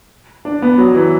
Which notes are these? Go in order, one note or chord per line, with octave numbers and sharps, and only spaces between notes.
D4
B3
F#3
E3